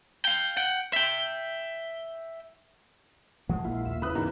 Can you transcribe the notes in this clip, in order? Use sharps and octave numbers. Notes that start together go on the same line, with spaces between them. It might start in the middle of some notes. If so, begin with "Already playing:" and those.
F5 G5
F#5 G5
E5 G5
F3 G#3 A3 F#5
A#1 A#2 G#3 A#3 E4 F4
D#2 F4 E5
C#3 E4 B4 C5 B5 D#6 F#6
E2 G2 D#4 F4 A#4 A#5